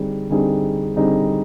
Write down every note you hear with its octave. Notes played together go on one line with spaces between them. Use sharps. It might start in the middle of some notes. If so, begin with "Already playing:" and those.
Already playing: D3 G3 C4 D#4 G#4
D3 G3 C4 D#4 G#4
D3 G3 C4 D#4 G#4